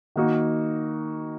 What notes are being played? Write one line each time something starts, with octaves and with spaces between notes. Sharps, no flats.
D#3 A#3 D#4 F#4